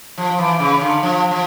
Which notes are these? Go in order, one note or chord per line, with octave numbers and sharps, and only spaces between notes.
F3
E3
C#3
D3
F3
F3